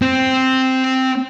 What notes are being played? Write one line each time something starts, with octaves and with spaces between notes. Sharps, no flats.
C4